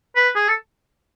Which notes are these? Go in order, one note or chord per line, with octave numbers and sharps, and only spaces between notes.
B4
G#4
A4